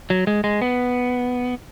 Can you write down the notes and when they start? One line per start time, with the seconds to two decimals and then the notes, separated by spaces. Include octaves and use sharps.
0.10 F#3
0.27 G#3
0.44 G#3
0.62 B3